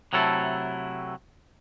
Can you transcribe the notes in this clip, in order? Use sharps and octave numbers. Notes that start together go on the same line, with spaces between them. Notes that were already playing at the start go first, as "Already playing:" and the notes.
C3 F#3 A3 E4 A4